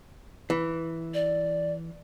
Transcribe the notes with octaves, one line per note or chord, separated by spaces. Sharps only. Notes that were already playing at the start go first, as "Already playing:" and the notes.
E3
D5